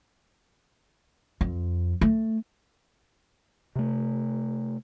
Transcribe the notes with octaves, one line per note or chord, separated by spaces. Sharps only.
F2
A3
C3 A3